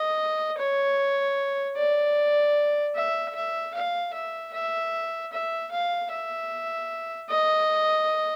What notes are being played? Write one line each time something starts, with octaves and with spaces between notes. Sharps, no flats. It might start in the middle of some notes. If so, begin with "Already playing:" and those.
Already playing: D#5
C#5
D5
E5
E5
F5
E5
E5
E5
F5
E5
D#5